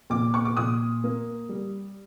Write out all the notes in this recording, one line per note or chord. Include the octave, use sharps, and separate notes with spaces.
A#2 D6
C#6
D6
A#2 D#6
A#3
G3